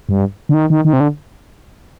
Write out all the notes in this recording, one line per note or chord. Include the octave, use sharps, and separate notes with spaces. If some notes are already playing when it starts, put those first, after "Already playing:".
G2
D3
D#3
D#3
D#3
C3
D3